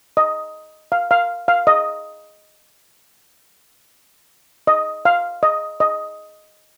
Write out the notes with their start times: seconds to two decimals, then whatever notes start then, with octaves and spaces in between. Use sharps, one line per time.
0.17 D#5
0.92 F5
1.11 F5
1.48 F5
1.67 D#5
4.67 D#5
5.05 F5
5.43 D#5
5.80 D#5